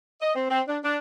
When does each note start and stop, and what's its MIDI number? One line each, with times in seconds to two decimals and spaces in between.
0.22 0.35 75
0.36 0.48 60
0.51 0.61 60
0.67 0.78 62
0.84 0.97 62